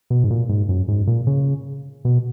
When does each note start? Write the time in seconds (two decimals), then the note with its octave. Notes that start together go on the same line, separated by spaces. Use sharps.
0.10 B2
0.24 G#2
0.30 A#2
0.49 G#2
0.69 F#2
0.88 G#2
1.07 A#2
1.27 C#3
2.05 B2